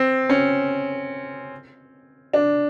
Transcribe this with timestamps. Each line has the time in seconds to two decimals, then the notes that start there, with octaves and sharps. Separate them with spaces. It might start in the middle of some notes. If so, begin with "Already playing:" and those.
Already playing: C4
0.29 C#4
2.33 D4